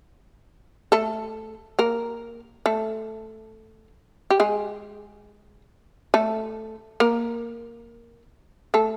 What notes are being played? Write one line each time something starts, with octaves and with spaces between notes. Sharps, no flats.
A3 A4
A#3 A#4
A3 A4
G4
G#3 G#4
A3 A4
A#3 A#4
A3 A4